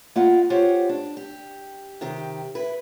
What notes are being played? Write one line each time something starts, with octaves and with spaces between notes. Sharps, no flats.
A#3 B3 E4 F4 D#5 F#5
F4 G4 C5 C#5 F#5
D4
G4
C3 D#3 G4
E4 B4